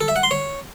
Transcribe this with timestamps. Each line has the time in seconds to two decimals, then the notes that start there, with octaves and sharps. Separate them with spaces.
0.01 A4
0.08 E5
0.16 F#5
0.23 C6
0.31 C#5